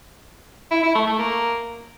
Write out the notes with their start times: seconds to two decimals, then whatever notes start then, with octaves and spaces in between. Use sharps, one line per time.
0.71 E4
0.83 E4
0.95 A3
1.07 A3
1.19 A#3